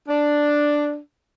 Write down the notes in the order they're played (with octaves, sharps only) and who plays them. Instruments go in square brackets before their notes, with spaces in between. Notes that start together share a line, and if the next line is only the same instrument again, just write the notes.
[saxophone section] D4